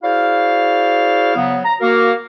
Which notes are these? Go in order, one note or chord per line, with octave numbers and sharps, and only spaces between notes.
E4 F#4 G#4 C5 D5 F5
C#3 F#3 B3
A#5
A#3 F#4 A#4 F5